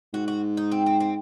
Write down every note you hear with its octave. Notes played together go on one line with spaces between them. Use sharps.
G#2 F#4
F#4
D#4
C4
C4
C4